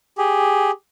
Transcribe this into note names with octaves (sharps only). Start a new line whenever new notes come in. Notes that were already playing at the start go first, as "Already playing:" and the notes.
G4 G#4